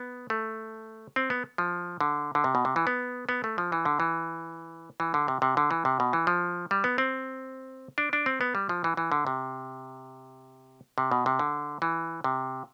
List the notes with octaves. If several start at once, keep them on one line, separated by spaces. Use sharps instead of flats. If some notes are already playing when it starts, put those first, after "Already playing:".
Already playing: B3
A3
C4
B3
F3
D3
D3
C3
B2
C3
E3
B3
B3
A3
F3
E3
D3
E3
E3
D3
C3
C3
D3
E3
C3
B2
E3
F3
G3
B3
C4
D4
D4
C4
B3
G3
F3
E3
E3
D3
C3
C3
B2
C3
D3
E3
C3